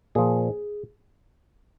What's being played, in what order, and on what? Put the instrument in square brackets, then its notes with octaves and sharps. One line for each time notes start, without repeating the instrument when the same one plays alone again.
[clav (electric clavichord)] A#2 F3 G#4